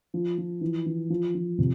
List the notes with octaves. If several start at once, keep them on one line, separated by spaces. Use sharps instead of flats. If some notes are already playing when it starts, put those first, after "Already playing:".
F3
F3
E3
E3
F3
F3
C3